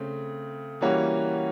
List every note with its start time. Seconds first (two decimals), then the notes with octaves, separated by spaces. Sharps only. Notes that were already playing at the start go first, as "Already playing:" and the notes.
Already playing: C#3 A3 C4
0.81 E3 G3 A#3 C#4 F#4